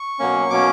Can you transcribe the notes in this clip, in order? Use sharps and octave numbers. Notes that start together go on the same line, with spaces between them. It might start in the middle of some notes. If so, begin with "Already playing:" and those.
Already playing: C#6
B2 F#3 A#3 C#4
B2 F#3 A#3 C#4 D6